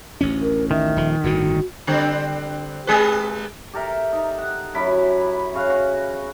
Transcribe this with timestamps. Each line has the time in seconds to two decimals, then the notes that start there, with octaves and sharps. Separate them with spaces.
0.21 A1 D2 C#4
0.42 A#4
0.71 D#3 E5
0.96 D#1 F3
1.24 G1 A2 D3 F#4
1.87 D3 G3 C4
2.87 G#3 G#4 B4
3.74 G4 A4 A#4 E5
4.13 D#4
4.38 F#5
4.75 F#2 E4 B5
5.54 C#3 F#4 F5
5.70 F#4